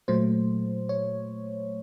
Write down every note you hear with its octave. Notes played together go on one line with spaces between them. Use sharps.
A#2 F#3 A3 C5
C#5